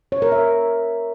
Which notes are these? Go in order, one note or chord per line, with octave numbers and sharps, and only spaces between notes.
C#5
A#4
E5